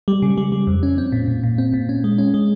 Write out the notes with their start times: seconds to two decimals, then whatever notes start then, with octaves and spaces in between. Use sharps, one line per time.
0.08 G3
0.22 C#3
0.37 G3
0.52 G3
0.67 F2
0.83 C#4
0.98 C4
1.12 A#2
1.28 A#2
1.43 A#2
1.58 C4
1.73 A#2
1.89 C#4
2.04 G#3
2.18 C#4
2.34 G#3